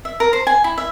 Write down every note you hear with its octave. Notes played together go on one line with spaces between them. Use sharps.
E5
A#4
C5
G#5
E4
E5